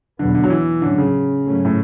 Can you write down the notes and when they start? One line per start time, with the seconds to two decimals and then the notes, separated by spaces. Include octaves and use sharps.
0.19 E2 B2 D3 F#3 B3
0.35 D3
0.44 F#3
0.50 E3
0.81 A2 D3 F#3 C#4
0.98 C#3
1.45 G#2 F#3 A3 C#4
1.65 A2